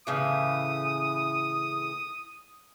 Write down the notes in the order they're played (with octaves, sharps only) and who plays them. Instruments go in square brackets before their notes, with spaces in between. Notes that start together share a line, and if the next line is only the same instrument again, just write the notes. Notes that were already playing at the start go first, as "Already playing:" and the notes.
[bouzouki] A2 C#3 E3 [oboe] D#6